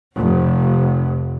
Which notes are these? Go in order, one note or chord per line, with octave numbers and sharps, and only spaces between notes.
F1